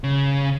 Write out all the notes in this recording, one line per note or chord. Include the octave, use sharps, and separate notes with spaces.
C#3